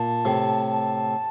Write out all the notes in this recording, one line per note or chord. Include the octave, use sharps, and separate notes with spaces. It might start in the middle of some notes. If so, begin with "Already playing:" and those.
Already playing: A#2 A5
A2 C3
A5